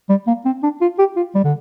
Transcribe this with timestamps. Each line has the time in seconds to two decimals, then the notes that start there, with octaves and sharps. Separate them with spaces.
0.09 G3
0.27 A#3
0.45 C4
0.63 D4
0.81 F4
0.99 G4
1.17 F4
1.35 G3
1.44 D3